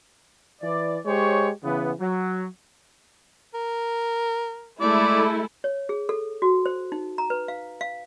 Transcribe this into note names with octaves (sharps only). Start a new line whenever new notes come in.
E3 D5
G#3 G4 C5 C#5
C#3 E3 B3
F#3
A#4
G#3 A3 E4 A4 D5
C#5
G#4
A4
F#4
C5
D#4
A#5
B4
F5
F5